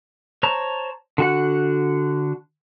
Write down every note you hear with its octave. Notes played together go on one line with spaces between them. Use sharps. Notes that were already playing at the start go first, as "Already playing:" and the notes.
C5 C#5 A5 A#5
D3 F#4 F#5